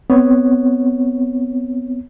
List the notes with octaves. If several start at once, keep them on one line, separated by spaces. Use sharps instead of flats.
B3 C4 C#5